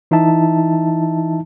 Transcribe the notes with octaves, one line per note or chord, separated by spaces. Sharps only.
E3 D#4 E4 E5 A5